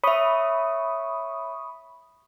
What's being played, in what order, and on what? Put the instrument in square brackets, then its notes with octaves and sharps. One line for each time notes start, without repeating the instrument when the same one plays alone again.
[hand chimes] C#5 E5 [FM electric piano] B5 C#6 D#6